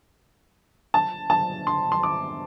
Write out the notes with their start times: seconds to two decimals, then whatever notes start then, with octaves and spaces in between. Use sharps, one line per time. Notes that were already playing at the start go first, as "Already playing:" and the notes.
0.94 A5
1.30 A5
1.67 C6
1.92 C6
2.03 D6